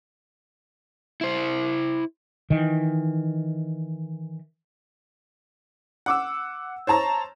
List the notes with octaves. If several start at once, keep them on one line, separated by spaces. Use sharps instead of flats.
E4 C5
D#3 E3
F#5 D6 E6
C5 C#5 A5 A#5